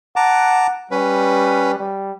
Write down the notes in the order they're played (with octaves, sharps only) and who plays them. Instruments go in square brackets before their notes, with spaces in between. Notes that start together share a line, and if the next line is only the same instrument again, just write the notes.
[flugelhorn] F#5 [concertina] A5 A#5 D6
[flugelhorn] G3 [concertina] C#4 B4
[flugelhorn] G3